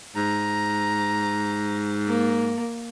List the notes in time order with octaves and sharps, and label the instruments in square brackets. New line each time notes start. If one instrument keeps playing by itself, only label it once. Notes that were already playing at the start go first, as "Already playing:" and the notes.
[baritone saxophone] G#2 [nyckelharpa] A#5
[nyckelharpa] A#3